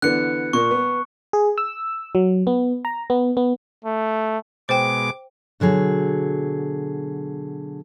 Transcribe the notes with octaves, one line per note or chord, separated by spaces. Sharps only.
D3 E3 B3 F#6 C#7
A#2 A#3 C#6
B3
G#4
E6
F#3
B3
A#5
B3
B3
A3
B2 G#3 C5 G5 D6
B2 D3 F#3 G#4